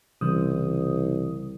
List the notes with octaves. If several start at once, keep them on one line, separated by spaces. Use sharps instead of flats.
C2 C#3 E3 D#6